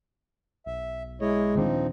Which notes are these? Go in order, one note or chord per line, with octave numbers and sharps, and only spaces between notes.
B1 E5
G#3 E4 C#5 D#5
D#1 D#3 F3 C4 D4 D#4